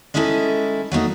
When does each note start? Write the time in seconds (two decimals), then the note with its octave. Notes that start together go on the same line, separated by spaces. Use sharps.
0.14 G#3 C#4 D#4 E4 G4 A4
0.91 F#3 A3 A#3 D#4